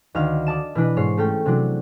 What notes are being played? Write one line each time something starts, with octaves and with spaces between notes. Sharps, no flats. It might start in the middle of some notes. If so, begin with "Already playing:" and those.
D2 D#3 F5 F6
D5 D#5 A5 E7
B2 E3 D4 B4
G#2 C#5 C7 C#7
A3 C#4 A4 G5
C3 E3 F#3 D4